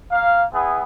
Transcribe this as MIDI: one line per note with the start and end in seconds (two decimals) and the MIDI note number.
0.11 0.44 58
0.11 0.44 77
0.53 0.82 59
0.53 0.82 64
0.53 0.82 68